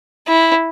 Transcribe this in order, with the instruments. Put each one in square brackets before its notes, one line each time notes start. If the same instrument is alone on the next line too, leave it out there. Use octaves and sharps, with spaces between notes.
[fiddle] E4